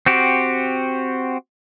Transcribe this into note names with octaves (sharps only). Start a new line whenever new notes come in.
C4 F#4 G4